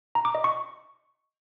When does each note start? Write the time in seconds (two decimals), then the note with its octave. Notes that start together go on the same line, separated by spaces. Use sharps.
0.15 A#5
0.25 D6
0.35 D#5
0.44 C#6